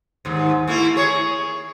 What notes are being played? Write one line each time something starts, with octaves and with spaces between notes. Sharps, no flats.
D#2 G#2
A3 A#3 E4
G#4 C#5